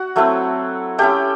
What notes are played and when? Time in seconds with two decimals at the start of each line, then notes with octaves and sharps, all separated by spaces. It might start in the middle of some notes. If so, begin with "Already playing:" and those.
Already playing: F#4 F#5
0.16 F#3 A3 C4 E4
0.98 A3 C#4 E4 G4 G5